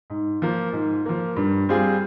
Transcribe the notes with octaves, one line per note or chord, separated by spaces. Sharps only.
G#2
F3 A#3
G#2
F3 A#3
G2
G3 C4 F4 G#4